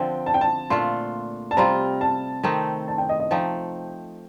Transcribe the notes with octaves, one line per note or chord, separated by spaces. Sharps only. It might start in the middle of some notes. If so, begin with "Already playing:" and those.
Already playing: D3 F3 C4 G5
A5
G5
A5
A#2 A3 D4 F4 C6
A5
C3 G3 C4 F4 A#5
A5
D#3 A3 C4 D#4
A5
G5
D#5
D#5
F3 A3 D#4 G5